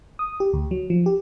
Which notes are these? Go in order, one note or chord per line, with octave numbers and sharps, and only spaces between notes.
D#6
G4
D2
F#3
F3
G4